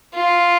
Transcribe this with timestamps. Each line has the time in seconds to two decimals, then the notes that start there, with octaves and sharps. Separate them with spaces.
0.15 F4